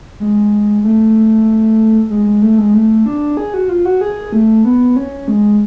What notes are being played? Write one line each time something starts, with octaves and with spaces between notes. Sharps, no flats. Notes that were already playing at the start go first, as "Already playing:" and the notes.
G#3
A3
G#3
G#3
A3
G#3
A3
D4
G#4
F#4
F4
F#4
G#4
A3
B3
C#4
G#3